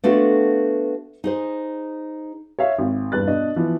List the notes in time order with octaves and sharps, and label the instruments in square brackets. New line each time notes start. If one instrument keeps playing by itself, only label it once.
[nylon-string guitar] A3 B3 D4 F4 F#4 A4
D#4 G#4 C5
[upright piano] C#5 E5 F5
G#1
E2 G2 B4 F#6 A6
B2 D4 D#5
E3 F3 B3